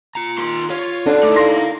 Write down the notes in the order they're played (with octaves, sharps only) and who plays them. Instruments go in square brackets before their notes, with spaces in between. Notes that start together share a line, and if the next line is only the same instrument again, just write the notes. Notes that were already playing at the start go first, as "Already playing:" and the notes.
[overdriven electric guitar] F4 A#5
[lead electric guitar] D#3 C6
[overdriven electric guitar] F4 [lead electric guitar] C#5
[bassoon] D3 [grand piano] D4 [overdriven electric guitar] D#4 F#4
[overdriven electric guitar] A3 [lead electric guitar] D#4 E4 [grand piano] D6
[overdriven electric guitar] A#4 F5 [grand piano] C6 A#6